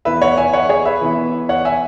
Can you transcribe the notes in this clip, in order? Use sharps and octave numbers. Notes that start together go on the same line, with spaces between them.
E3 B3 E4 B4 E5
C#5 F#5
E5 G#5
C#5 F#5
G#4 C#5
B4 E5
E3 B3 E4
C#5 F#5
E5 G#5